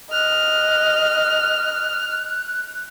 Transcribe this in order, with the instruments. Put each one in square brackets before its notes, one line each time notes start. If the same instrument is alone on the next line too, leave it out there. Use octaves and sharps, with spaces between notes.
[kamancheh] D#5 [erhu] F6 [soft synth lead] F#6